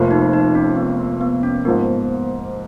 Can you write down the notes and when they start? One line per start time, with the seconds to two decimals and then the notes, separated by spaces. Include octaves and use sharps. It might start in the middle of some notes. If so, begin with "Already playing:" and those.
Already playing: F1 F2 F3 A#3
0.11 D#4
0.33 D#4
0.55 C#4
0.77 B3
0.99 A#3
1.21 B3
1.43 C#4
1.65 G#2 F3 A#3 B3